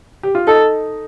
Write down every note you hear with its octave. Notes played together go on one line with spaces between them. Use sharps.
G4
F4
D#4 A4